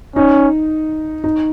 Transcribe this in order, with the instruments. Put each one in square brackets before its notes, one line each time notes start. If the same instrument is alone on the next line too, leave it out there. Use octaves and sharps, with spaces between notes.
[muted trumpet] C#4 [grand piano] D#4
[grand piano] D#4